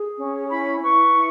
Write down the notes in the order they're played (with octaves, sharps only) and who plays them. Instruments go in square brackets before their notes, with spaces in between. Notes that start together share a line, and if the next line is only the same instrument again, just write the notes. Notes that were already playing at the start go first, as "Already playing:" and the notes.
Already playing: [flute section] G#4
C#4
E4 B5
B4 C#6
E4